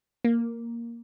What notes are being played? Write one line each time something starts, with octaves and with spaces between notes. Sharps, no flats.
A#3